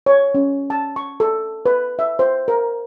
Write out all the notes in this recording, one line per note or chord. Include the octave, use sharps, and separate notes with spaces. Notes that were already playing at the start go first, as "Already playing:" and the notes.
C#5
C#4
A5
C#6
A4
B4
E5
C5
A#4